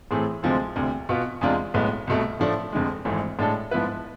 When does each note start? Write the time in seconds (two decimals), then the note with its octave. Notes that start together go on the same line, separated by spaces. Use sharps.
0.11 A2 E3 A3 C4 G#4
0.43 D2 C3 F3 G#3 C4
0.76 E1 D2 C3
1.09 B2 B3 F4
1.41 E2 C3 G#3 D4 F4
1.74 B1 A2 G#3 B3
2.07 C2 B2 A3
2.40 A2 F3 A3 D4
2.72 F1 F2 D3 G#3
3.05 G#1 G#2 E3 A3
3.39 A2 G#3 D4 A4
3.71 G#2 F3 B3 E4 B4